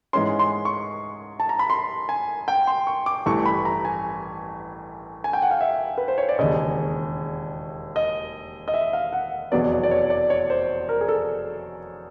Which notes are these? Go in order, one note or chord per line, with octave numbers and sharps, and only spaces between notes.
G#2 E3 G#3 C#4 C6
C6
C#6
A5
A#5
B5
C6
G#5
G5
C6
C#6
D6
A1 G2 E3 A3 C#6
B5
A#5
G#5
G#5
G5
F#5
F5
E5
B4
C5
C#5
D5
E1 D#2 C#3 D#5
D#5
D#5
E5
F5
F#5
F1 E2 B2 F#3 B3 D5
D5
D5
C#5
D5
C#5
C5
A#4
G#4
A4